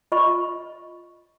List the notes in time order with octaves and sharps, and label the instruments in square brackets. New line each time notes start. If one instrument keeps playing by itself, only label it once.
[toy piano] F4 D#5 B5 C#6